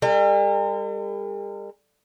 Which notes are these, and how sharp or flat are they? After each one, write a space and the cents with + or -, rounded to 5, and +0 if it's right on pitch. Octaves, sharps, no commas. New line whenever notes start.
G3 +45 A#4 -45